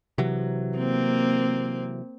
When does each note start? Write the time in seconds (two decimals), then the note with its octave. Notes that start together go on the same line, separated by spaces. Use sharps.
0.18 C3 E3 F#3
0.77 A#3 C4